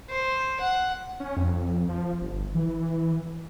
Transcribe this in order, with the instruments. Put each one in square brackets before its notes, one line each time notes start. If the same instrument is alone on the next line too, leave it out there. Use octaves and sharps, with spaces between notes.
[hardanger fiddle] C5
F#5
[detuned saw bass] C#4
F2
F3
G1
E3